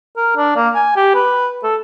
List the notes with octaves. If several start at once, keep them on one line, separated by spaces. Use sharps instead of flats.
A#4
D4
A#3
G#5
G4
B4
A4